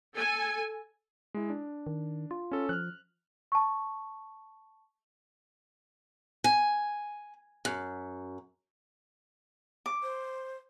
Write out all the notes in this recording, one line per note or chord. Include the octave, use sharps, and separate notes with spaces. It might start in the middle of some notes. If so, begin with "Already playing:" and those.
A4 G#5
G#3 E4
D4
D#3
F4
C#4 A4
F3 F6 F#6
A5 C#6
G#5
F#2
D6
C5